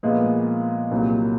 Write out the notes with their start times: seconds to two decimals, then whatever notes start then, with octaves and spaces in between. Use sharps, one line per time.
0.03 A#2 F3 G#3 B3
0.91 C2 A#2 F#3